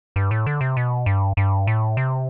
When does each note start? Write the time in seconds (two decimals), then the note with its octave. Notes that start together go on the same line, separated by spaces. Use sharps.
0.16 G2
0.31 A2
0.47 D3
0.61 C3
0.77 B2
1.06 G2
1.37 G2
1.67 A2
1.97 C3